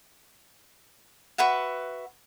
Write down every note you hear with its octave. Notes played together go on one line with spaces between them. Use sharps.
F#4 B4 E5 F#5